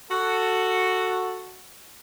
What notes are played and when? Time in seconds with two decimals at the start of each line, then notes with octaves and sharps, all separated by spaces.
0.11 F#4 A4